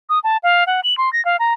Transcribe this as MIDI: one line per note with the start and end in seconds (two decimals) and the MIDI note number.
0.09 0.19 87
0.24 0.37 81
0.43 0.64 77
0.67 0.80 78
0.84 0.96 102
0.98 1.12 84
1.13 1.23 94
1.25 1.37 77
1.39 1.53 82